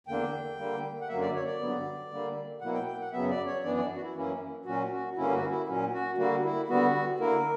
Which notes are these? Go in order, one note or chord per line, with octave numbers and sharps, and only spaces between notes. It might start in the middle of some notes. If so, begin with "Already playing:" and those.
E2 D3 A#3 D4 G5
D3 G3 A#3
F#5
F#2 D3 F#3 A#3 E5
D5
C#5
D5
G2 D3 F#3 B3
D3 G3 A#3
B2 F#3 A#3 E4 F#5
G5
G5
F#5
F#2 C#3 F#3 B3 E5
D5
C#5
F#2 E3 B3 D4 D5
D5
F#4
E4
F#2 E3 A#3 C#4 E4
A#2 F#3 C#4 F#4
F#4
G2 D3 A#3 C#4 E4
E4
F#4
E4
A#2 F#3 C#4
F#4
D3 G3 A#3 F#4
E4
D3 G3 B3 F#4
D3 A#3 E4 A#4